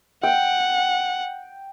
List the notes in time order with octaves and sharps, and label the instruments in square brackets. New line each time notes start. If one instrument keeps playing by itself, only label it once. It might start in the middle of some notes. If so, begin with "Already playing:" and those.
[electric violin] F#5 [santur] G5